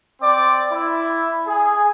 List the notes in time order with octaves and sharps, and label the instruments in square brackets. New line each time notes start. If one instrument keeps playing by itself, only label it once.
[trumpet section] C4 D5 D6
E4
G#4